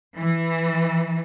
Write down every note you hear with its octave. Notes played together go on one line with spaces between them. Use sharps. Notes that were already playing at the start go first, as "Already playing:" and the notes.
E3